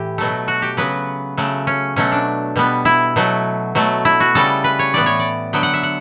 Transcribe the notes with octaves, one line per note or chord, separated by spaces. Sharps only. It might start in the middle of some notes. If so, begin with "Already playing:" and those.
Already playing: A2 E3 G4
B2 F#3 A3
F#4
G4
C#3 F#3 B3 B4
C#3 F#3 A3
C#4
B2 F#3 A3 C#4
D4
B2 G3 B3
E4
B2 F#3 A3
B2 F#3 A3
E4
F#4
C#3 G3 B3 A4
B4
C#5
A2 E3 B3 D5
C#5
D5
D3 F#3 B3 G5
F#5
E5
F#5